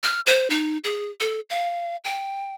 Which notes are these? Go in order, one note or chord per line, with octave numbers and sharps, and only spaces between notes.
F6
C5
D#4
G#4
A4
F5
G5